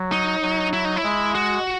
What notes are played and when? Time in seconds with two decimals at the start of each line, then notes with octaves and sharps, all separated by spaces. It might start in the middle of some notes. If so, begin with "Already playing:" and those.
Already playing: F#3
0.12 D#4
0.42 F#3
0.73 E4
0.85 D#4
0.96 E4
1.04 G#3
1.35 F#4